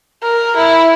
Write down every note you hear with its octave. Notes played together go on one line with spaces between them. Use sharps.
A#4
E4